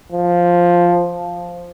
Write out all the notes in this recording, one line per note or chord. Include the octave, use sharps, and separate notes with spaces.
F3